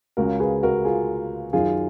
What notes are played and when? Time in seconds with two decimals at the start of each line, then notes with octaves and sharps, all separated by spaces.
0.17 C#2 C#3 F#4 A#4
0.40 G#4 B4
0.63 F#4 A#4
0.85 F4 G#4
1.53 F#2 D#3 F4 G#4